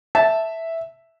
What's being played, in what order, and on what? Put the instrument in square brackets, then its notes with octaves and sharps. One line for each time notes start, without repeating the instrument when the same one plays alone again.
[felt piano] E5 [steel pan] A5